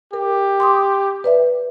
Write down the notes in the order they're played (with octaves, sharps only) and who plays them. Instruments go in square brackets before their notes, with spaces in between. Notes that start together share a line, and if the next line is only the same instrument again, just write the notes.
[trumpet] G4 [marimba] A#4
[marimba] C6 D6 D#6
B4 D5 E5